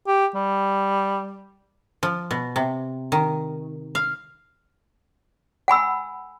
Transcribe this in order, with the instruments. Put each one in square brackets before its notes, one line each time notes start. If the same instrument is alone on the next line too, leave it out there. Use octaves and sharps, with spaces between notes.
[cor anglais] G4
G3
[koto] F3
B2
C3
D#3
F5
[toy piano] F#5 G#5 B5 E6